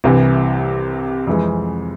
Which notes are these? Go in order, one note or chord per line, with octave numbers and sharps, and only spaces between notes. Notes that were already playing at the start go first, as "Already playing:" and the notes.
C2 C3 E3
F2 E3 G#3